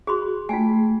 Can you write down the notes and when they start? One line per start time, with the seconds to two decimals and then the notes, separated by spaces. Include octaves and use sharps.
0.07 F#4 G#4 B5 C6
0.49 A3 F4 G#4 G5 G#5